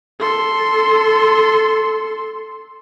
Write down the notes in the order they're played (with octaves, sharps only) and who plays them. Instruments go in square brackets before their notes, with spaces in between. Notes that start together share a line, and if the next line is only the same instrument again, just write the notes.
[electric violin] A4 C6